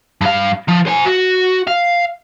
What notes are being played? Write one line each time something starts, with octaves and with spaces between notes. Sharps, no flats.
G2 F5
F3
C5 G#5
F#4
F5